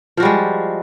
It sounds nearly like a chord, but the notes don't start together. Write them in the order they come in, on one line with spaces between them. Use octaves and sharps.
F3 F#4 G3 G#3